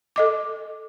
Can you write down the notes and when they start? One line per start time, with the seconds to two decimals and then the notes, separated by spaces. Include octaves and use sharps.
0.16 A4 D#5 D6